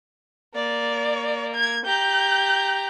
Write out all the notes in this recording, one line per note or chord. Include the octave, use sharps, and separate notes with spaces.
A#3 D5
G#6
G4 A#5 G6